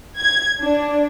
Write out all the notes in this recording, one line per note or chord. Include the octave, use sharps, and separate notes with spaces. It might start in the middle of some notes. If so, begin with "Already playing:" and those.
G#6
D4